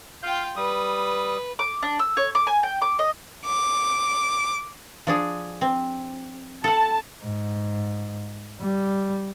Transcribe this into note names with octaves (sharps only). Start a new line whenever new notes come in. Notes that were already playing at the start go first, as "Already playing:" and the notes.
F4 F5 G5 G6
G3 B4 D#6
D6
D4
E6
C#5
D6
G#5
G5
D6
D#5
D6
F3 D4 G#4
C4
A4 F#5 A5
G#2
G3